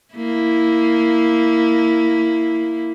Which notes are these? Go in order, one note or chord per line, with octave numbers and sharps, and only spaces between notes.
A#3 E4